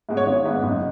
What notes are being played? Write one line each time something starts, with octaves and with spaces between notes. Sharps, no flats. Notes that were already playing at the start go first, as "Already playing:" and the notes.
G#2 G#3 B3
C#5
G#1
G#2 G#3 B3
F#1